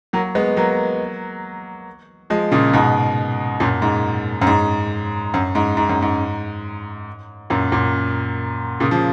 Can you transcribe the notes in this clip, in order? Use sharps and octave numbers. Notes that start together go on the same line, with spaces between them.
F#3 A#3
G#3 B3
F#3 A#3
F3 G#3
A#2 C#3
G#2 B2
F#2 A#2
G#2
F#2
G#2
F#2
G#2
G#2
F#2
G#2
F#2 A#2
F#2 A#2
A#2 C#3
C#3 F3